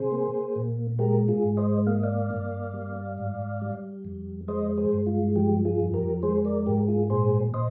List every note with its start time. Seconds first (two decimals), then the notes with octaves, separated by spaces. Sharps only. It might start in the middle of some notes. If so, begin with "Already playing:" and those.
Already playing: C3 G#4 C5
0.12 A#3
0.55 A#2
0.99 G#3 G4 A#4
1.28 F4 G#4
1.43 G#2
1.57 C5 D#5
1.87 A#3 F5
1.95 D#5
2.03 D5 F5
2.31 G2
2.74 G3
3.18 G#2
3.61 G3
4.05 F2
4.48 G#3 C5 D#5
4.77 G#4 C5
4.92 G2
5.06 F4
5.36 F3 G4
5.65 F4 G#4
5.80 F2
5.94 G4 A#4
6.23 G#3 G#4 C5
6.45 A#4 D5
6.66 G#2 G4 A#4
6.88 F4 G#4
7.10 A#2 G#4 C5
7.54 A#2 C5 D#5